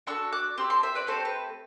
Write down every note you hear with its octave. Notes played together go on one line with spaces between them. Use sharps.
D4 F#4 A4 C6 E6
D6 F#6
C4 G4 C6 E6
A5 C6
C5 E5
B4 D5
A3 C4 G4 A4 C5
B4